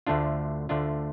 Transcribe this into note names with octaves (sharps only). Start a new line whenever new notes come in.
D2 D3 A3 D4 F4
D2 D3 A3 D4 F4